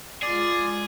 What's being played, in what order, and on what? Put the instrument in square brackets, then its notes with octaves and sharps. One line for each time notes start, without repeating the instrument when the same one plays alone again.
[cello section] G#3 F4 [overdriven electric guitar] G#4 [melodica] D5